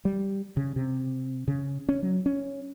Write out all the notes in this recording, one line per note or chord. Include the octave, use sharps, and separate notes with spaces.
G3
C#3
C3
C#3
C#4
F#3
C#4